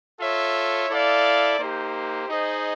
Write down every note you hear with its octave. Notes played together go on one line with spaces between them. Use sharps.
F4 A4 C#5 E5
E4 A4 D5 F5
A#3 D#4 G4 C5
D#4 G#4 C5 D#5